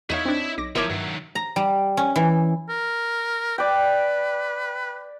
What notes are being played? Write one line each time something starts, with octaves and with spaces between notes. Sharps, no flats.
E2 D#4 E4 C#5 E5 F5 D#6
C4 D4
B1 D6 A#6
G1 F3 E4 A#4 C#5 E5 D6
G2 D#3 F#3
A#5
G3
C#4
E3
A#4
B4 D5 G5